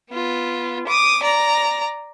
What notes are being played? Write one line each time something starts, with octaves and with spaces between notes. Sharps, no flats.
B3 F4
D6 D#6
D5 A#5